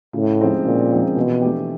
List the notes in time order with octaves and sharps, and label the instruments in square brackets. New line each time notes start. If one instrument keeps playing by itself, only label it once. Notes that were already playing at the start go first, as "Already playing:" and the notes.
[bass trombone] A2 [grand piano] C#3
[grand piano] F3 G#3 C4 D#4
[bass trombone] A#2 [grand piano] C#3
[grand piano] F3 G#3 C4 D#4
[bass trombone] B2 [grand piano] E3
[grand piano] A3 D4 G4